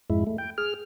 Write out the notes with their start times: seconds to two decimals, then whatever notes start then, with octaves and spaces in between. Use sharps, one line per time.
0.10 F2 G#2 G#3 E4
0.27 A3
0.38 G5
0.58 G#4 F6